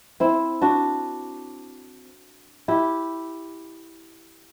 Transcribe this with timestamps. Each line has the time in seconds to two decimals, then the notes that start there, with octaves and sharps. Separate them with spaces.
0.20 C4 E4
0.61 D4 F#4
2.68 E4 G4